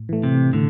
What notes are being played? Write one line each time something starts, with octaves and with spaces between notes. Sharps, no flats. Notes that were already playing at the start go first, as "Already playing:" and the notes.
Already playing: A2
E3 A3
C3
A2 D3